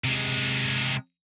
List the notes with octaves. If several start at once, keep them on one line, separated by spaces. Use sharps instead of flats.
C3 G#3